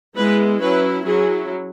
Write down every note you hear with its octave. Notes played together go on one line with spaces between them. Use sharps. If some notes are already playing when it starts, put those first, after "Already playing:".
G#3 B3 E4 B4
F#3 C#4 E4 B4
F#3 C#4 E4 G#4